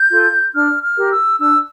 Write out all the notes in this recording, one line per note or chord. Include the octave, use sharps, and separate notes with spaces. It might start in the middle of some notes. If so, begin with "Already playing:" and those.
Already playing: G6
F4 A4
D4 F6
F6
G4 A#4
E6
D4 E6